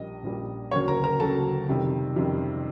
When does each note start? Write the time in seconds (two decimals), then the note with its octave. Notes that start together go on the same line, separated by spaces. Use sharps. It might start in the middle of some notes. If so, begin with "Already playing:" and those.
Already playing: A#1 A#2 G3 D#5
0.23 A#1 A#2 G3
0.71 D2 C#3 F#3 A#3 C#5 C#6
0.88 A#4 A#5
1.04 A#4 A#5
1.20 D2 C#3 F#3 A#3 A4 A5
1.68 F2 C3 D#3 G3
2.16 F2 C3 D#3 G3